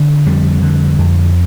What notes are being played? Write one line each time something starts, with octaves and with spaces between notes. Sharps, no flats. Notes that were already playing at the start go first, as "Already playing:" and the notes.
Already playing: D3
F2 G3
D3
F2